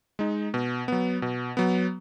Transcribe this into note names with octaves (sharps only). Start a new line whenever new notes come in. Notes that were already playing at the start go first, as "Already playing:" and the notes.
G#3 D#4
B2
F#3 B3
B2
F#3 B3